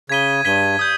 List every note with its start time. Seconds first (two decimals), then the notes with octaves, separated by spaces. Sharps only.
0.09 C#3 G#6 B6 D#7 G7
0.45 G2 G#6 B6 D#7 G7
0.79 D#6 G6